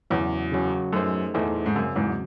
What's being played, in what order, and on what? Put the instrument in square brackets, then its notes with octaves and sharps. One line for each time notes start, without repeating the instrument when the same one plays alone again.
[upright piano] E2 [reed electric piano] C#3 F#3 C#4 F#4
[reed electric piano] C#3 F#3 C#4 F#4
[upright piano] F#2 [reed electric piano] A3 D#4 G#4 C5
[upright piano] E2 [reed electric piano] A3 D#4 G#4 C5
[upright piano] G#2
[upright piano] F#2 [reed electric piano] C#3 F#3 C4 F#4
[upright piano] E2 G#2